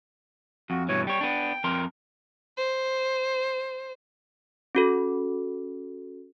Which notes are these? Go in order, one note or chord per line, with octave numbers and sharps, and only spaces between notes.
F2 F#4
G2 B2 E3 C#5
G3 C#5 G5
B3 D4
F2 A#4 C6
C5
C#4 F#4 A4